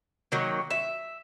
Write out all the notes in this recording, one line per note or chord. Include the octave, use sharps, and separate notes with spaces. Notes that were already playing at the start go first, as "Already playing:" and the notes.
D#3 F#3 A#3
E5